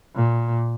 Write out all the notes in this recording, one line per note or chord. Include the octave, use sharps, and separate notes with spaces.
A#2